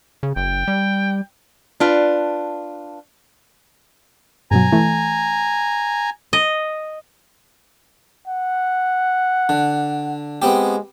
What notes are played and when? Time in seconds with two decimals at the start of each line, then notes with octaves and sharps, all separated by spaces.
0.23 C#3
0.36 F#1 G5
0.68 G3
1.80 D4 F4 B4
4.51 G2 B2 F#3 G#5 A#5
4.72 E3 A3
6.33 D#5
8.28 F#5
9.49 D3
10.42 G#3 B3 C4 G4